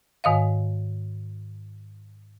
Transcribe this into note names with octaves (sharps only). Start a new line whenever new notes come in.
G#2 D#3 D#5 F5